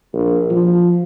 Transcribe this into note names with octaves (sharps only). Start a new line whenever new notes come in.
A#1
F3